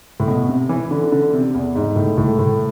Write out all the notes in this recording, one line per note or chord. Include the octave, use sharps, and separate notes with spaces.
A2
B2
C3
E3
D3
D3
C3
E2
G#2
A2
A2
A2